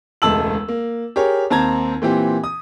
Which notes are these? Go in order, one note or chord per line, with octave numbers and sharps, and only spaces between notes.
E1 C#2 A3 A5 E6 F#7
A#3
G4 G#4 A#4 C#5
D#2 C4 A5 A#5 G#6
A#2 E3 C4 G4
D#6